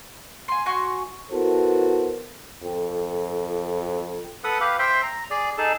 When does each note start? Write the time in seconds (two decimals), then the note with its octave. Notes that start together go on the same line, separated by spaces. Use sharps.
0.48 G#5 C6
0.66 F#4 G#5 C6 C#6
1.31 B3 E4 F#4 A4 A#4 C5
2.63 F2 A4 G5
4.44 A4 B4 F#5 D#6
4.61 G4 B4 F5
4.79 C5 E5 G5 C6
5.03 A#5
5.31 G#4 D5
5.58 D#4 G#4 A4 A5